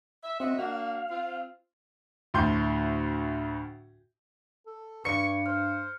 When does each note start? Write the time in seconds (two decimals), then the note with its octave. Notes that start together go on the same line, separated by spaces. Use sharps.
0.24 E5
0.40 C4 F#4 D#5 E5
0.59 A#3 D4 F#4 F5
1.11 C4 F4
2.34 D2 A2 C6 G6
4.67 A4
5.05 G2 B4 D5 C#6 C#7
5.46 C5 F6